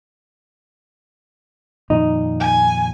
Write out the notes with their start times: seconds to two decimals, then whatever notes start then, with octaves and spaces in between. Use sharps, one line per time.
1.90 F2 A#2 D#3 D#4
2.40 G#5